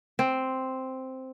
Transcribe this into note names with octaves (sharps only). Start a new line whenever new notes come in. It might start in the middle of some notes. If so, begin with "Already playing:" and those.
C4